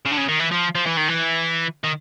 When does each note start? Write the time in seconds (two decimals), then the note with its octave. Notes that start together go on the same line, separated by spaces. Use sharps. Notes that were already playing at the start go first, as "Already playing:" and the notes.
0.06 C#3
0.12 D3
0.18 C#3
0.29 D#3
0.40 E3
0.52 F3
0.75 F3
0.86 E3
0.97 D#3
1.08 E3
1.84 D#3